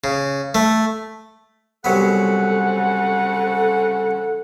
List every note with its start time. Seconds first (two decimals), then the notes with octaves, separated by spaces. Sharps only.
0.04 C#3
0.55 A3
1.84 C2 C#3 F#3 B3 A4 C5 F#5